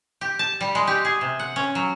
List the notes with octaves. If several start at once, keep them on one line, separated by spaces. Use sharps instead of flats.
G4
A5
G3
G#3
G4
G#4
C3
F#5
C#4
F#3